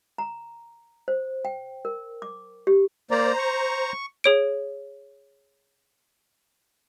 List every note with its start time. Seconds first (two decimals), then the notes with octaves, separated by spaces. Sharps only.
0.18 A#5
1.08 C5
1.45 G5
1.85 A#4
2.22 D6
2.67 G4
3.11 A#3 C5 D5 A#5
3.39 C#6
4.24 G#4 C#5 D7